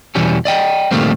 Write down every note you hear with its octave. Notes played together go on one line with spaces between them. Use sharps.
E2 B2 E3 G3 C#4
D5 D#5 G5
A#2 D#3 G3 A3 A#3 C4